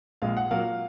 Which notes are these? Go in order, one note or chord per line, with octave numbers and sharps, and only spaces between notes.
A#1 A#2 G#3 F5
F#5
A#2 F#3 A#3 F5